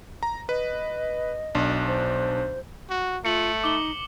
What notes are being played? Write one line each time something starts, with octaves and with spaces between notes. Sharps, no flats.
A#5
B4 D#5
B1 D4
C5
F#4
A3 F4 C#7 F#7
D#4 D6 G7